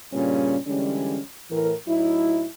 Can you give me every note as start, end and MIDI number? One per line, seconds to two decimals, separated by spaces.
0.13 0.57 43
0.13 0.57 46
0.13 0.57 49
0.13 0.57 55
0.13 0.57 61
0.67 1.18 50
0.67 1.18 52
0.67 1.18 55
0.67 1.18 56
0.67 1.18 61
1.50 1.73 45
1.50 1.73 52
1.50 1.73 70
1.88 2.45 45
1.88 2.45 54
1.88 2.45 63
1.88 2.45 64